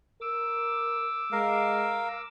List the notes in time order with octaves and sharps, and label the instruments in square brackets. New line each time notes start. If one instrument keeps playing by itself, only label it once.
[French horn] A#4 [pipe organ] D6 E6
[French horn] G#3 [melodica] A#4 F5